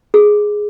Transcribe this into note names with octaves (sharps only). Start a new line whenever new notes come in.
G#4